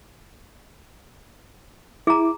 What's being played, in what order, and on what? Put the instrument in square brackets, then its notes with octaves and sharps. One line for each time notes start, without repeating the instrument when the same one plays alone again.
[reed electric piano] E4 D6 [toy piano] G#4 A#5